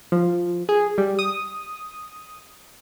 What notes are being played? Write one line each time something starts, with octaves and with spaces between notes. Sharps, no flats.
F3
G#4
G3
D#6